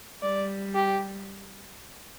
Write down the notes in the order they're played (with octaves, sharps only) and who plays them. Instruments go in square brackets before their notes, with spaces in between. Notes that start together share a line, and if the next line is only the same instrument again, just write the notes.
[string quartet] G3 [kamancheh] D5
[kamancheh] G4